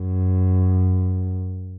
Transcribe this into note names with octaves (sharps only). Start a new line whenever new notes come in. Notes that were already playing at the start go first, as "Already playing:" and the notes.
Already playing: F#2